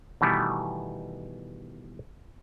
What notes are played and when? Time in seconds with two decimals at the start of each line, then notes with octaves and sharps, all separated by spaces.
0.21 B2 D#3 E3 G3 A3 B3